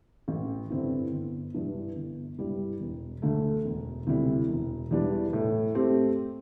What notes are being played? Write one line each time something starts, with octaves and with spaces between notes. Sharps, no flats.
A1
G2 D3 C4 E4
G1
G2 E3 G3
G1
G2 G3 E4
E1
D2 D3 A3
E1
D2 C3 G3 E4
E1
E2 E3 G3 D4
A2
A3 C4 G4